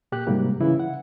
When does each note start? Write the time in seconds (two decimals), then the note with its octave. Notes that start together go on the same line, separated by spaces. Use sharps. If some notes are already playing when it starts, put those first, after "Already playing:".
0.12 A#2 G4 F#6
0.27 G#2 C3 F#3 G3 A#3
0.60 C#3 E3 E4
0.80 F#5